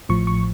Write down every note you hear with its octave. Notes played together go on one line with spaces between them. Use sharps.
A1 A2 F3 C#6
C#6